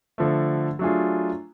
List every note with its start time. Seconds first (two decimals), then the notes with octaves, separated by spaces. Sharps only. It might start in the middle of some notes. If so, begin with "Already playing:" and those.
0.18 D3 F3 A3
0.79 F#3 A3 D4 F4 G#4